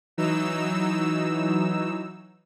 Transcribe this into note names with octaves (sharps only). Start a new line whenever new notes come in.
E3 F#3 D#4 E6